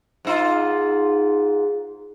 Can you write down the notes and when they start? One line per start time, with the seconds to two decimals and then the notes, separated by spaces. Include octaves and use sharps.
0.25 G#2 D#4 F4